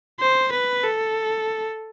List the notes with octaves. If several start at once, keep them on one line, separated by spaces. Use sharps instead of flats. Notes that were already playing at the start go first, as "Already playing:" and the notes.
C5
B4
A4